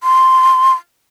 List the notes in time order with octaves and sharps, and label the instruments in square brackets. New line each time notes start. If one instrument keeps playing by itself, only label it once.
[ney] C6